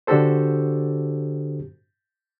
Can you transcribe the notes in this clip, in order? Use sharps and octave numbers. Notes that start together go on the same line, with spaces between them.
D3 D4 F#4 G4 A4 C5